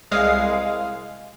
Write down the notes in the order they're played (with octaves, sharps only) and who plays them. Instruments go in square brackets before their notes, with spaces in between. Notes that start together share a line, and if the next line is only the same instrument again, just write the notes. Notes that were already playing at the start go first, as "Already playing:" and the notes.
[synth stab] C2 G#3 F5 D#6